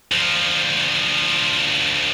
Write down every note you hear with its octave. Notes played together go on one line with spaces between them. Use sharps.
D2 F3